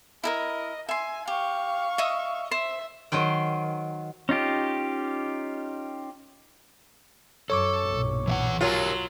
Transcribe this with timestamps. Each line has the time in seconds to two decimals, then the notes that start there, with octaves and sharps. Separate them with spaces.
0.24 E4 A4 A#4 D#5
0.89 E5 G#5 C6
1.27 G4 F5 C#6
1.98 D#5 E5 D#6
2.51 C5 E5
3.12 D#3 F#3 C5 G5
4.29 C#4 D#4 F4 G4
7.50 F#2 A4 C#5 C#6 D6
7.84 B1 G2 A#2
8.27 E3 E5 F#5
8.61 F#3 F4 G4 A#4